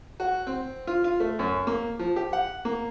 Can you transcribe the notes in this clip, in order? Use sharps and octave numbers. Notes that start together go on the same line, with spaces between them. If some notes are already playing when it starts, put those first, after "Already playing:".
F#4
C4
F4
F4
A3
F#2
A#3
F3
G4
F#5
A#3